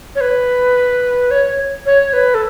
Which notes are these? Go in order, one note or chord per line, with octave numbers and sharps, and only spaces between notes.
C#5
B4
C#5
C#5
B4
A4